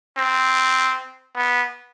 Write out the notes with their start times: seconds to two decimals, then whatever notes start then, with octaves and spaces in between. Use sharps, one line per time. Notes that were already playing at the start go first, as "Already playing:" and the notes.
0.17 C4
1.36 B3